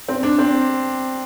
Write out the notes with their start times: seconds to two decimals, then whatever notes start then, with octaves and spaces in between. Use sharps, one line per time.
0.08 C4
0.23 D4
0.38 C4